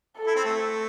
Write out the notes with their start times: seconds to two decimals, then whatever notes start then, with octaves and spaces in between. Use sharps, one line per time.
0.17 A4
0.27 E4
0.36 C4
0.45 A3